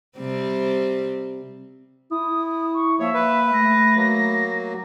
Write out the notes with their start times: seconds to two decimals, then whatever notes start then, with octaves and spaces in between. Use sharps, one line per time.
0.18 C3 G3 C4
2.11 E4 D#6
2.74 C#6
3.00 F3 A#3 C#5 E5
3.14 B4
3.53 A3 A#6
3.96 F#3 A#3